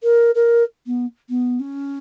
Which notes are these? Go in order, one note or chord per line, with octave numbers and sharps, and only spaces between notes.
A#4
A#4
B3
B3
C#4